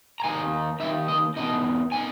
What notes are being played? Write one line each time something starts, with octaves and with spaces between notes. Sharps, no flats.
A#5
D#3 A#3 D#4 G#5
D#3 A#3 D#4 E5
D#5
E3 B3 D#4 D#5
B3 D#4 G#5